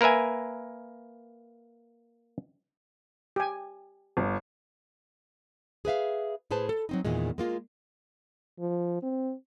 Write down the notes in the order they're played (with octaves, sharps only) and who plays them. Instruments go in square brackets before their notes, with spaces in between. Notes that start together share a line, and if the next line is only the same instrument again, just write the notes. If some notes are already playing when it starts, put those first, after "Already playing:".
[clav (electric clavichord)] A#3 A#4 B4 E5 G#5
[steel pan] G4 G#5
[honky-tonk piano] G1
[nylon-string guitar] G#4 B4 E5 F5
A2 G#4 B4 C5 A5
A4
F#3 C4 D#4
E2 A#2 D#3 G#3
G#3 A#3 F4
[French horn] F3
C4